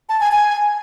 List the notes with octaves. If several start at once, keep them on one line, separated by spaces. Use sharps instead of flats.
A5
G#5
G#5